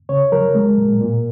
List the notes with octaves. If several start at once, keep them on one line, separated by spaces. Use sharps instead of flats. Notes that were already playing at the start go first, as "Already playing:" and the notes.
C#3 C#5
F#3 A#4
G#3
A#2
A#2